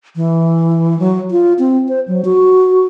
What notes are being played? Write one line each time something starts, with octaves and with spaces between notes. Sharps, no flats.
E3
F#3
F4
C4
C5
F#3
F#4